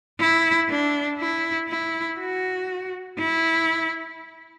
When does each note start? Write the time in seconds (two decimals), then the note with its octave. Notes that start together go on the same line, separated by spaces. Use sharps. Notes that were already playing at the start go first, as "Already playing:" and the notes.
0.19 E4
0.69 D4
1.19 E4
1.69 E4
2.19 F#4
3.18 E4